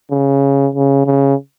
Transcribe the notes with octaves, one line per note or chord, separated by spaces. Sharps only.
C#3
C#3
C#3